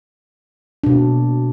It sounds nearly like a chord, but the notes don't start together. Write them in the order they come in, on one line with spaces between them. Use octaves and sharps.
D4 B2 A#3